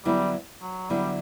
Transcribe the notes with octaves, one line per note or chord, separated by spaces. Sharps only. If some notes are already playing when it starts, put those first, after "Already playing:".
D3 F#3 G3 B3 E4
F#3
D3 F#3 G3 B3 E4